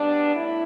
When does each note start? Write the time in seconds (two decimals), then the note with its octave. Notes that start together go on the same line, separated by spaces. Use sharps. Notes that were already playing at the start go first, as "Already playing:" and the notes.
Already playing: B2 G3 B3 D4
0.35 A2 E4